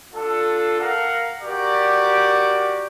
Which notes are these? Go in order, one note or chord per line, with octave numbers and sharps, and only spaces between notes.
D4 F4 A4
A#4 F5 F#5
F#4 G4 A#4 D5